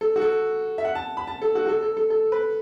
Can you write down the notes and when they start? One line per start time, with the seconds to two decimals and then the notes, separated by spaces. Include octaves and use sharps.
0.01 A4
0.16 F#4
0.21 A4
0.78 E5
0.85 F#5
0.95 A5
1.17 B5
1.27 A5
1.42 A4
1.55 F#4
1.65 F#4
1.68 A4
1.82 A4
1.97 A4
2.10 A4
2.32 B4